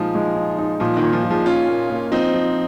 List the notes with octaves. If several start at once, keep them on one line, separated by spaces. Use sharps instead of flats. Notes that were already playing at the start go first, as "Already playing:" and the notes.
Already playing: A#2 F3 G#3 D#4
G#3
D#4
D#4
A#2 F3
D#3
A#2
F3
A#2
F3 G#3
A#2 C#4 F4
A#3
A#3
F3 C4 D#4
F3